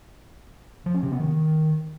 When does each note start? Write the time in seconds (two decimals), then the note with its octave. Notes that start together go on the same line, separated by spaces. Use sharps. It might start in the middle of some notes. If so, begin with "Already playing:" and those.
0.86 F3
0.94 C#4
1.03 C3
1.11 B3
1.20 D#3